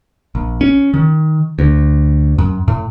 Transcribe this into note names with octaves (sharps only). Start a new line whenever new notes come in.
A#1
C#4
D#3
D2
F#2
A2